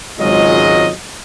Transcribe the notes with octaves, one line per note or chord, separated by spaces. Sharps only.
G#1 C#2 F#3 G#3 F4 D#5